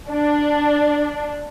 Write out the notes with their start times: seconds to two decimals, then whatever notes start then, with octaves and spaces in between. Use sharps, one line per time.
0.11 D4